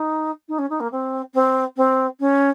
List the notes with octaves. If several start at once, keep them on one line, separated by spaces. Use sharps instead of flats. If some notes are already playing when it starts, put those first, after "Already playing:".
Already playing: D#4
D#4
C#4
D#4
A#3
C4
C4
C4
C#4